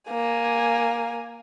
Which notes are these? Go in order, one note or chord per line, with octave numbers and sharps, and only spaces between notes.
A#3 G#5